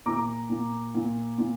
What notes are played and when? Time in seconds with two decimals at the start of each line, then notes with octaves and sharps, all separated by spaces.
0.06 A#2 A#5 D6
0.50 A#2
0.95 A#2
1.38 A#2